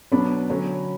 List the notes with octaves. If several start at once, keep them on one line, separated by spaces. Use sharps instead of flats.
B2 F#3 B3 D4 B5
D3 F#3 C#4